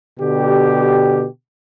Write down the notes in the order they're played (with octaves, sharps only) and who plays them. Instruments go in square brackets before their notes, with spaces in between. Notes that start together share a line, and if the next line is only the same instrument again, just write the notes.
[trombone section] B2 D3 G4